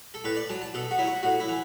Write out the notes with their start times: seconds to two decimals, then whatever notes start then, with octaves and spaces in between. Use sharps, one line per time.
0.14 A4
0.24 A2 B4
0.37 D5
0.49 F#3 A5
0.61 A5
0.74 B2 A4
0.91 F#4
0.98 F#3 E4
1.07 F#4
1.23 A2 F#4
1.40 E4
1.48 E3